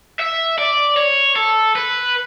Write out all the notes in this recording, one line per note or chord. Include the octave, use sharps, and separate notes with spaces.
E5
D5
C#5
A4
B4